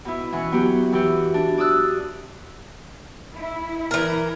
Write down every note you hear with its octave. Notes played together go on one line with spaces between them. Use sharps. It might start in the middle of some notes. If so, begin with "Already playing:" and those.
B2 E4
E3 C#4 F#5
F#3 B3 F#4 G4
E3 F#4 G4
D4
D5 D#6 E6 F#6
E4
E3 A#4